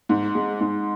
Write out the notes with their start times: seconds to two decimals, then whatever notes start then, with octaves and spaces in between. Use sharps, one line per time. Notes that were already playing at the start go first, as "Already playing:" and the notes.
0.09 G#2
0.35 G#3
0.61 G#2